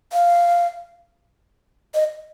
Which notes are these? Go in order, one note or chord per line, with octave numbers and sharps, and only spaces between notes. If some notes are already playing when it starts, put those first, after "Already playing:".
F5
D#5